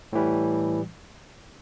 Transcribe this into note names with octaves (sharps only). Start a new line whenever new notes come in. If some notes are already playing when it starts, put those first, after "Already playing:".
A2 E3 G3